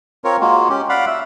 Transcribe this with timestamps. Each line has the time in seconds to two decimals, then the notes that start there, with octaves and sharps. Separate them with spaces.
0.24 C4 F4 A#4 C#5
0.41 G#3 A#3 F4 F#4
0.69 C#4 G4
0.89 D5 F5 F#5 B5
1.06 E5